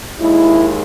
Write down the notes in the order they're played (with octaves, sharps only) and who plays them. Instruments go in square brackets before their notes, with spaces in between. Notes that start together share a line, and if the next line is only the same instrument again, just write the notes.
[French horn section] D#2 D#3 G#3 E4